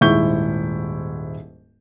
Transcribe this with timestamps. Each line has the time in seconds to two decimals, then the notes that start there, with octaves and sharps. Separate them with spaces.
0.01 D#1 G#2 E4 C#6 G6 G7